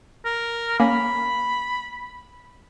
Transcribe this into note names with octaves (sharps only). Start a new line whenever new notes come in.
A#4
A#3 C#4 B5